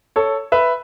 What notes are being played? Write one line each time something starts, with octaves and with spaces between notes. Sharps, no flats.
A4 C#5
B4 E5